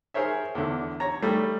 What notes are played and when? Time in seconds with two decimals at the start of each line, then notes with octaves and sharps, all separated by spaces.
0.14 G#4 A#4 C5 C#5 E5
0.55 E2 D3
1.00 C#5 A#5
1.22 G3 A3